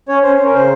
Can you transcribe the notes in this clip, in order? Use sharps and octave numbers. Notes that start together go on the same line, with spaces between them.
C#4 C#5
C#4 C5
C#4
A#4
C#3 C5